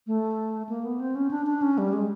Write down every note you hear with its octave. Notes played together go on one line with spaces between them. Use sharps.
A3
A#3
B3
C4
C#4
D4
D4
C#4
G3
G#3